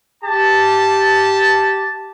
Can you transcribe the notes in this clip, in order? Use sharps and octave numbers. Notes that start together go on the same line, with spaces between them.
G4 A5